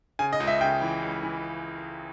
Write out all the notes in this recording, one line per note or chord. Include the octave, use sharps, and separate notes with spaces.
C#3 G#5
D#5
C#2
E5
C#3 G5
E3
C#2
E3